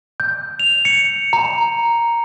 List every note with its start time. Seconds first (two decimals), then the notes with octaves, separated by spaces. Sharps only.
0.20 G6
0.59 F7
0.85 C#7
1.33 A#5